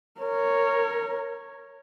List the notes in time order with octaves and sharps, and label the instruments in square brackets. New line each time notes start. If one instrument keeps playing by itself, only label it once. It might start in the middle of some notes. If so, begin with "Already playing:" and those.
[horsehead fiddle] A#4 [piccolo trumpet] C#5